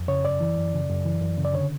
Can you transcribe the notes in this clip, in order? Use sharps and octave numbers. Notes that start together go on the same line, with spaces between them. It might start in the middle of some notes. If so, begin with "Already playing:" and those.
Already playing: F2
C#3 C#5
F#2 D5
E3
F#2
C#3
F#2
E3
F#2
C#3
D5
D3 C#5